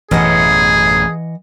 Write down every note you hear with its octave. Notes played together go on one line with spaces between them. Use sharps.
A1 F#2 B2 E3 G#4 D#5 F#5